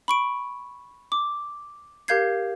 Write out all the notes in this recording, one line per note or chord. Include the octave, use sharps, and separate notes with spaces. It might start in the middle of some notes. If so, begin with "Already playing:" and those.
B5 C#6 D7
D6
G4 A#4 F5 G6 G#6 C7